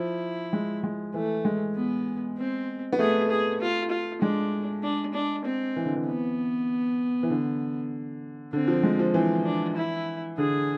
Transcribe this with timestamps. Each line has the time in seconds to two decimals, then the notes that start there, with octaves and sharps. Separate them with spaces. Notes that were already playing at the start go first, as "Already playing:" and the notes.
Already playing: F3 E4
0.53 G#3
0.84 G#3
1.14 E3 A3
1.45 G#3
1.75 B3
2.38 C4
2.92 B3
2.99 A3 G#4
3.30 G#4
3.61 F4
3.91 F4
4.22 G#3 D4
4.83 D4
5.14 D4
5.45 C4
5.76 E3
5.85 D3
5.96 E3
6.06 B3
7.23 E3
7.30 D3
8.53 D3 C4
8.68 F3
8.83 G#3
8.99 F3
9.14 E3 C4
9.45 D4
9.76 E4
10.38 D3 G#4